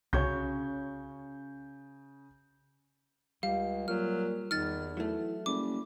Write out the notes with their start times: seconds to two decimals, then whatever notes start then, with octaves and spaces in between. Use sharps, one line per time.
0.13 C2 C#3 C#4 F#4 C#5 C#6 G6
3.43 C#2 G3 F5
3.88 A#2 F#3 F6
4.51 E2 D#3 F6 A6
4.97 E3 F#3 A3
5.46 F#1 G3 D6